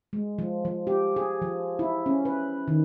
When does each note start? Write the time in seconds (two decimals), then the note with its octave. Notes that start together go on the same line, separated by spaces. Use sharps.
0.13 G#3
0.39 F3
0.65 F3
0.87 G4
1.16 G#4
1.42 F3
1.79 E4
2.06 C#4
2.25 B4
2.68 D#3